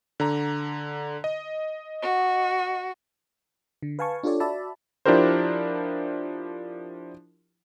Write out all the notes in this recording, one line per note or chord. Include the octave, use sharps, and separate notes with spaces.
D3 A#5
D#5
F#4
D3
B4 F5 G#5 A5 C#6
D4 F4 G4 A4 C#5 D5
F#4 D5 E5 A5 B5
F3 D4 E4 G4 A#4 C5